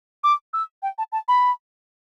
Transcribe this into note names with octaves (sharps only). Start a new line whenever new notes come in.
D6
E6
G5
A5
A5
B5